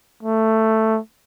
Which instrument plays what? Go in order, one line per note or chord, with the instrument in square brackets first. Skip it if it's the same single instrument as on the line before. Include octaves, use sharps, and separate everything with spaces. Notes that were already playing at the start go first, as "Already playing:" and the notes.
[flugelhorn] A3